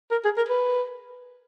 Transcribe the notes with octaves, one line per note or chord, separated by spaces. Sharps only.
A#4
G#4
A#4
B4